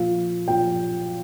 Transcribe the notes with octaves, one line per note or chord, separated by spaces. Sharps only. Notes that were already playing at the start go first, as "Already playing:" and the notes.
Already playing: A#2 F3 F5
A#2 F3 G5